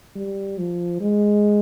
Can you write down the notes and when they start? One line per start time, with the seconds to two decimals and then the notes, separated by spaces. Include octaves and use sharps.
0.16 G3
0.58 F3
1.01 G#3